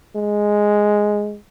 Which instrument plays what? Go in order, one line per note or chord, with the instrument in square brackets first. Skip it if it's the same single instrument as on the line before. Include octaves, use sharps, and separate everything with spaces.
[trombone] G#3